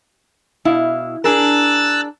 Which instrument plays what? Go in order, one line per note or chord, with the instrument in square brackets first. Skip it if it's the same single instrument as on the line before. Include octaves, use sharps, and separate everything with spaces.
[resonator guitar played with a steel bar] B2 E4 F5
[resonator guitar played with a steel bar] D4 G#4 A#4 [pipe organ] E6 F#6 A6